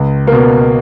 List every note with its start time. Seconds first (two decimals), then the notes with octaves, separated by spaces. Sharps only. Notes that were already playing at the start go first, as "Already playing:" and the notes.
Already playing: C#2
0.27 B2 A#3